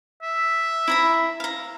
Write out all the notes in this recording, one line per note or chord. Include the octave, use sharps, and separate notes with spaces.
E5
E4 A#5 B5
F5 A#5